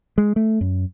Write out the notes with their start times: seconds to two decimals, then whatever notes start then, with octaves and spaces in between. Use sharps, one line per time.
0.18 G#3
0.36 A3
0.61 F#2